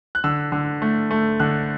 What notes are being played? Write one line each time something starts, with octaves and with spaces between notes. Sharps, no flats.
F#6
D3 E6
D3
A3
A3
D3 F#6